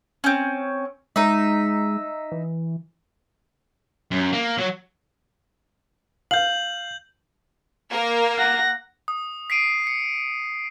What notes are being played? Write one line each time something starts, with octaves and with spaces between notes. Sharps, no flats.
C4 C#4
G#3 D#4 E5
E3
F#2
A#3
F#3
F5 G6 F#7
A#3 A#4
F#5 A#6
D#6
B6 C7 D7 D#7
C#7